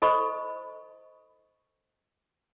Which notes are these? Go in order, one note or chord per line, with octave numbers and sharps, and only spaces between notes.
E4 A4 C5 D#5 B5 C#6